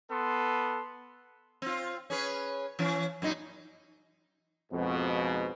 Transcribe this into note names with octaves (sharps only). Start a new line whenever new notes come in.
B3 A4 C6
C4 F4
C#4 G#4 B4
E3 C#4
F#2 A#2 D#4
F2 G#2 B2